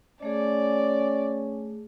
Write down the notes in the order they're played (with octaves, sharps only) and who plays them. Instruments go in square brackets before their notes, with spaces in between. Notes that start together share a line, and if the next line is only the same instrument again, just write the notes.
[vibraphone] A3 G#4 [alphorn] C#4 [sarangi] D5